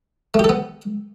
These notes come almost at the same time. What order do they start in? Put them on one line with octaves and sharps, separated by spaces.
A3 G4 A4 B3